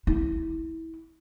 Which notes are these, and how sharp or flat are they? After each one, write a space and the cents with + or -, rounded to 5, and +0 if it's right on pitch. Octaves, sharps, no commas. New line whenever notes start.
E4 -25